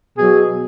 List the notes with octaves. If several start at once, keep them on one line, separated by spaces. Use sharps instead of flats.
B2 F#3 G#4